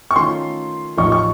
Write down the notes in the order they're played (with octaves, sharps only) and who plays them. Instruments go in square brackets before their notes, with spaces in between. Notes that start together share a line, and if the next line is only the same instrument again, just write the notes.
[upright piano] C#6
[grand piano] D#3 A3 C#4 F4 [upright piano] C6
[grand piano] A1 A2 F3 A3 D#4 [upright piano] C#6
[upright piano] C#6